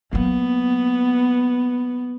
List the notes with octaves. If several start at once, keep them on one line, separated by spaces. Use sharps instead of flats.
F#3 A#3 B3